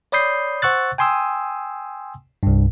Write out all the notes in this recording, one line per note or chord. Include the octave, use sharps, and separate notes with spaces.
C#5 D5 B5 D#6 G6 C7
C5 F#5 C#6 E6 F#6 A6
G5 G#5 C6 D#6 E6
C2 G2